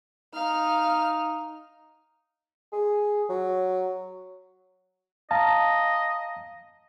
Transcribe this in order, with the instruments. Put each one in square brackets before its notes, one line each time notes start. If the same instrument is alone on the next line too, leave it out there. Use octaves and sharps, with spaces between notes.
[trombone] D#4 [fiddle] F5 F6
[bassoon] G#4
F#3
[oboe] D#5 [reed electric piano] F5 A5 A#5